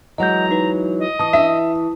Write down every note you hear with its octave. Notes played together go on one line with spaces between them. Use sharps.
E3 F#3 G#3 D#5 F#5 A#5 G6
D#4 B4
D#5
E3 A5 D#6
E5